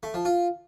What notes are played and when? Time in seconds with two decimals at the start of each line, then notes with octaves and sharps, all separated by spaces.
0.03 A3
0.14 F3
0.25 F4